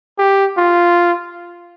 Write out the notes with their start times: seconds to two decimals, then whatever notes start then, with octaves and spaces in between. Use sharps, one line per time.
0.19 G4
0.58 F4